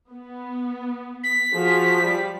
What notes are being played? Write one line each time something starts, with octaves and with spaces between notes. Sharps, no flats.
B3
B6
F3 F#4 G#4
G3